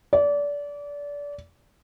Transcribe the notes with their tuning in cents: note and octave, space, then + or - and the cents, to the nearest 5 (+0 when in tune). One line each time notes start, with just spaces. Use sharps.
D5 -25